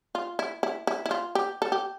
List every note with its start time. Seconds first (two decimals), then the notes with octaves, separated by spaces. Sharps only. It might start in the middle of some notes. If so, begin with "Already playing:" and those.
0.15 F4
0.39 E4
0.63 E4
0.87 E4
1.06 E4
1.11 F4
1.35 G4
1.62 A4
1.72 G4